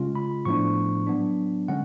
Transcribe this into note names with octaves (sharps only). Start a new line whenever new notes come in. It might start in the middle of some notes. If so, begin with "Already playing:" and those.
Already playing: C#3 G#3 C#4 F4
B5
A2 F3 B3 D4 C#6
F#3 B3 D4
D3 G#3 C#4 F#5